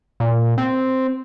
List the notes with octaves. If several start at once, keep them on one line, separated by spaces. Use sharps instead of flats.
A#2
C4